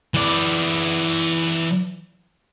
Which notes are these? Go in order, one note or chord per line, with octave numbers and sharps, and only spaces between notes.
E3 D5